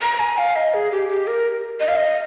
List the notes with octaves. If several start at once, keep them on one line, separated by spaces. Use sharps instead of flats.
A#5
G#5
F5
D#5
G#4
G4
G4
A#4
D#5
F5
D#5